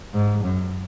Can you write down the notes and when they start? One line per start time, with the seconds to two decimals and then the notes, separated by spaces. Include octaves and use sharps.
0.13 G#2
0.44 F#2